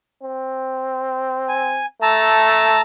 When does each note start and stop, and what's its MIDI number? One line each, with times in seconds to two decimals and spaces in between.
0.23 1.83 60
1.49 1.86 80
2.02 2.79 57
2.02 2.81 81
2.02 2.81 82
2.02 2.81 88